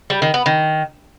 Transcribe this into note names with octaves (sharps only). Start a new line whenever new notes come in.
G3
D#3
B3
D#3